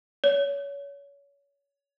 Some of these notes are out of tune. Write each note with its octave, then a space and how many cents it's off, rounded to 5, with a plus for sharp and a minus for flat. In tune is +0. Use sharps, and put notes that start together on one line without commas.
C#5 +25